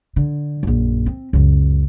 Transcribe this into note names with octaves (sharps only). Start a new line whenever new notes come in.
D3
A#1 F#2
C4
C#2 F#2